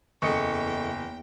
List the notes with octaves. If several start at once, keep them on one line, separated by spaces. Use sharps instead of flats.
F#1 E2 A4 D#5 G5 C#6 C#7